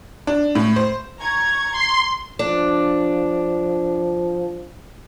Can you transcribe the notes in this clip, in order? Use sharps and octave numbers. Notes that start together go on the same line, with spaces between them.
D4
A2
C5
A#5 C#6 G#6
C6
F3 D4